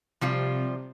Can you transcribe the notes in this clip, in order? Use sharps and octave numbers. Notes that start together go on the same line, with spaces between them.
C3 F3 G3 F4